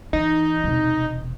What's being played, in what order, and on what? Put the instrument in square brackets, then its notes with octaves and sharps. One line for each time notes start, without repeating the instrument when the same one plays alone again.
[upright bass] E3 [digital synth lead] D#4
[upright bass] E1 C3